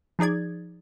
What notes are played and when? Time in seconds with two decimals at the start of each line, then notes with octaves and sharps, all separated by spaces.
0.19 F3 D#4 G#4 D5 G#6